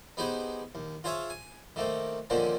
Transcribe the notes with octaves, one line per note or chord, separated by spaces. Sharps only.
B3 D#4 G4 G#4 B4 C5
D#2
F4 G#4 C5 C#5 E5 F5
G#5
D#3 A3 A#3 C4
D3 D#3 F3 A#3 C4 C#4